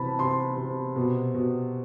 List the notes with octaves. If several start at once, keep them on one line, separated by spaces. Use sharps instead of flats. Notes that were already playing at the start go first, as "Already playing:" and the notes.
Already playing: C3 E3 A5 B5
C3 C6
C3
B2
B2